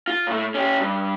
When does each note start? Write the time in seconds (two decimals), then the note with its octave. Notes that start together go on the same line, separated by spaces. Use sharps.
0.08 F4
0.27 A2 A3
0.54 C#4 G4
0.81 G2